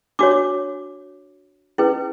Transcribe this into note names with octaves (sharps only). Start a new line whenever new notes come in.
D4 F#4 C#5 D6
C#4 E4 G#4 B4